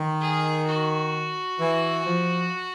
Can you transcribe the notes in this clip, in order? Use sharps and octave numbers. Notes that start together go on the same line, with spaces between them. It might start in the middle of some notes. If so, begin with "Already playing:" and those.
Already playing: D#3
G#4
F#4
E3
F3